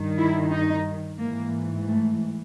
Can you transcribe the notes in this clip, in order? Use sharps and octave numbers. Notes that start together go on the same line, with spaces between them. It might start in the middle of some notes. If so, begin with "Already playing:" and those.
Already playing: G2 D#3
E4
D#4
G#2 E3 A#3
A3